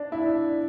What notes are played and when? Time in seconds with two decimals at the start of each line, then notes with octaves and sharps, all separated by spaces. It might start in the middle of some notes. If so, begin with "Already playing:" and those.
Already playing: D4
0.12 E4
0.22 D4